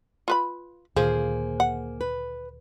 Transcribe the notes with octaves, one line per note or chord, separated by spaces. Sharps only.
F4 B4 B5
D2 A#2 D#3 F3 A#3 G#4 C5
F#5
B4